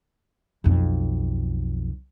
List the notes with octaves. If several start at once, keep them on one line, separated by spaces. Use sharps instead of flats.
B1 F2